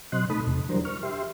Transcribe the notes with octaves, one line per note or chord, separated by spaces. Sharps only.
B2 F#3 C4 D#5 C6 F#6
B2 A3 D#4 A4 B5 D#6
E2 C3
E3 F#3 G3 D4 A#4 C5
C#6 F6
G4 E5 C6